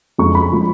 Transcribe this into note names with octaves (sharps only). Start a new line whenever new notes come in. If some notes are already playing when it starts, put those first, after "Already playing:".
F2 C#3 G#3 C#6
B5
F3 G#3